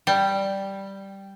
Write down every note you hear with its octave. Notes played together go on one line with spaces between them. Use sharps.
G3